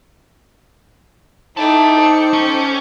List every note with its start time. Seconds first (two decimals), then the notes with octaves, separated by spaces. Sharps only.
1.57 D#4 E4 A4 D#5 G5 A5 D6
1.99 C5 C#7
2.33 C#4